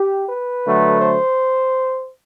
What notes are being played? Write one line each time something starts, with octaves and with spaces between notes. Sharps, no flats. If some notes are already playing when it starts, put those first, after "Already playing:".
Already playing: G4
B4
D3 F#3 A3
C5